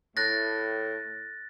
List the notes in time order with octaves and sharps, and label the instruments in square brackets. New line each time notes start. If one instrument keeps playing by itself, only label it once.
[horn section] A2 [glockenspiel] F#6 A6 A#6